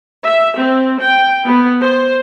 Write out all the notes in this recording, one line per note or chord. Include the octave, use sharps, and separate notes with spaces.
E5
C4
G5
B3
C5